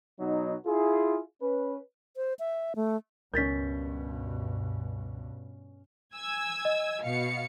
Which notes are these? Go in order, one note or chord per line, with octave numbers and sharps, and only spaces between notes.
B2 F#3 D#4
E4 F4 G#4
C#4 B4
C5
E5
A3
C#2 G2 B2 C#4 A#4 G6 A6 B6
G#5 E6 G#6
D#5
B2 F5 C#7